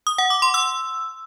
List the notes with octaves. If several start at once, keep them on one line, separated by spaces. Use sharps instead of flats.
D#6
F#5
D6
C6
E6